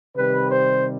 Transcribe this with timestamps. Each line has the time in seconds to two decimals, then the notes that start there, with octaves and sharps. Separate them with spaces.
0.16 C3 D#3 G3 B4
0.50 C5